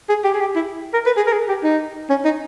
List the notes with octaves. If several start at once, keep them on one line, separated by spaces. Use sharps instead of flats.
G#4
G4
G#4
G4
E4
A#4
B4
G#4
A#4
G#4
G4
D#4
C#4
D#4